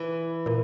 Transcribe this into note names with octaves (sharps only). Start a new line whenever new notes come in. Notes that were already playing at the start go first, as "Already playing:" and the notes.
Already playing: E3
A#2 A#3